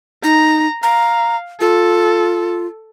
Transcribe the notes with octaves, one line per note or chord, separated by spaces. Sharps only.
D#4 A#5
F5 A#5
F4 A4